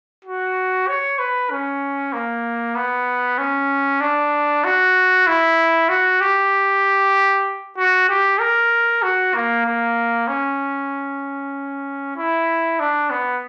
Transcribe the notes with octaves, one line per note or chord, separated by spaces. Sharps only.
F#4
C#5
B4
C#4
A#3
B3
C#4
D4
F#4
E4
F#4
G4
F#4
G4
A#4
F#4
A#3
A#3
C#4
E4
D4
B3